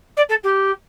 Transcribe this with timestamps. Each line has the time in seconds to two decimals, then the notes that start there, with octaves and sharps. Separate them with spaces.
0.16 D5
0.29 A4
0.43 G4